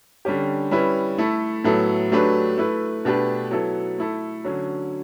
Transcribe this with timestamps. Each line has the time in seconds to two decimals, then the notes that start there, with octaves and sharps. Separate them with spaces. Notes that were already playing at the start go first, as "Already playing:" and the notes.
0.25 D3 G3 C#4 G4
0.71 G3 C#4 E4 B4
1.18 A3 E4 A4
1.64 A2 F#3 B3 E4 A4
2.12 F#3 A3 D4 G4 B4
2.58 A3 E4 B4
3.05 B2 A3 D4 G4 B4
3.51 F#3 B3 E4 A4
3.98 A3 E4 A4
4.44 D3 F#3 C#4